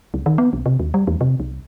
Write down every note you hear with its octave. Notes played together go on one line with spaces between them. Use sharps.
C#2
D#3
B3
B1
C3
D#2
G3
E2
C3
C2